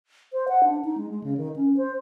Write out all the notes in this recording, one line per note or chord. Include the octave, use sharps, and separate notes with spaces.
C5
F#5
D4
D#4
G#3
G#3
C#3
D#3
C#4
C5